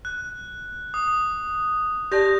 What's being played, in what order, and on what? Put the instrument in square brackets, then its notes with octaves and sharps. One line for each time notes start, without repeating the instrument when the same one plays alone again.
[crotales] F#6
D#6
[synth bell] G4 D5 A5 [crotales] G6 A#6